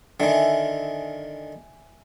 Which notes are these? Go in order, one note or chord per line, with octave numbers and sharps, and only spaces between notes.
D3 D#3 E5 G#5